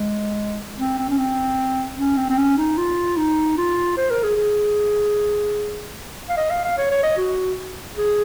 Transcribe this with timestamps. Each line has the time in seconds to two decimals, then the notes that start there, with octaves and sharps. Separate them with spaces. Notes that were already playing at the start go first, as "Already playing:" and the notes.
Already playing: G#3
0.77 C4
0.98 C4
1.10 C#4
1.18 C4
1.97 C#4
2.17 C4
2.30 C4
2.38 C#4
2.57 D#4
2.77 F4
3.17 D#4
3.57 F4
3.97 C5
4.11 A#4
4.24 G#4
4.37 G#4
6.29 F5
6.37 D#5
6.50 F5
6.64 F5
6.78 C#5
6.91 C#5
7.03 D#5
7.17 F#4
7.97 G#4